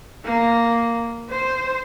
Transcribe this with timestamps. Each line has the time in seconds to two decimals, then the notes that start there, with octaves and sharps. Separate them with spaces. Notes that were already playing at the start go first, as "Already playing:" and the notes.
0.25 A#3
1.30 C5